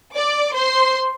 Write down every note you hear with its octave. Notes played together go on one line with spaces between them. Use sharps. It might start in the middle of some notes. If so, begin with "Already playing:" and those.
D5 D6
C5 C6